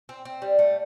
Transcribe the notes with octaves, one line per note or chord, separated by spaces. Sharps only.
C4
C4
G3
A3